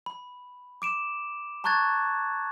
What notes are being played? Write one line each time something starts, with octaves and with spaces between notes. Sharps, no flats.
B5
D6 D7 E7
A5 A#5 C#6 F#6 G#6 A6